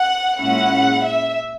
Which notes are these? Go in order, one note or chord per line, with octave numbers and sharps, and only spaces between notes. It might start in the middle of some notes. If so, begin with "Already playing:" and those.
Already playing: F#5
A#2 G#3 C#4 E4 F#5
E5